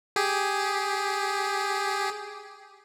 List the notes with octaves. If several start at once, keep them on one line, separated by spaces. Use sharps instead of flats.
G4 G#4